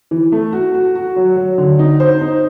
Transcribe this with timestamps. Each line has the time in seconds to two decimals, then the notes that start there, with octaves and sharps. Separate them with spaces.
0.11 E3
0.32 A3
0.53 F#4
0.74 F#4
0.95 F#4
1.16 F#3
1.36 F#3
1.58 D3
1.79 D#4
2.00 C5
2.21 D#4